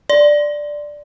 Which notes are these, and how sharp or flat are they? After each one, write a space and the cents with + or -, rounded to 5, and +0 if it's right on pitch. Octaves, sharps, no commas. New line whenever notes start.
D5 +5 C6 +0